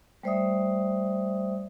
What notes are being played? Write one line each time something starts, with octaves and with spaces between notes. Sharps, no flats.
G3 A3 C5 D5 E5 D#6